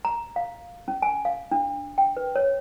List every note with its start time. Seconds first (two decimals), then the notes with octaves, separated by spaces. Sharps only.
0.05 A#5
0.36 F5
0.88 C#4
1.02 G#5
1.25 F5
1.51 D4
1.98 G5
2.17 B4
2.36 C#5